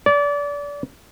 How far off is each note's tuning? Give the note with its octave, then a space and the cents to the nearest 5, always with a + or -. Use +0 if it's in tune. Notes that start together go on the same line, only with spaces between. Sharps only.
D5 -30